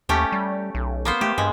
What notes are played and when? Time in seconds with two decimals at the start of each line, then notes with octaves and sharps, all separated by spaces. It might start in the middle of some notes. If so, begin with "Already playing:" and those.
0.09 D#2 A3 C#4 G4
0.32 G3
0.75 B1
1.05 A#3 B3 C5
1.21 A3 G4
1.38 G2 G#3